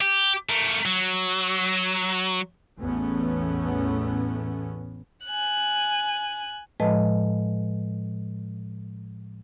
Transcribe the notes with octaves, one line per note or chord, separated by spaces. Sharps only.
G4
A3 A#4
F#3
A1 E2 A3 B3 C#4
G#5 F#6
A2 F3 G#3 B4 D#5 A5